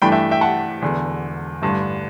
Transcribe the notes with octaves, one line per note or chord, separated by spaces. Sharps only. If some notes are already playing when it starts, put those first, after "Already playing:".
G2 E3 A3 D4 G5 B5
E5 G5
E5 G5
F#5 A5
E1 E2 D3
A1 G2 D3